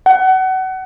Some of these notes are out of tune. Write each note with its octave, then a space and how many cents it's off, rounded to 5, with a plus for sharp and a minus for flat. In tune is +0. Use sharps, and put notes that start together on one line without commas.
F#5 +30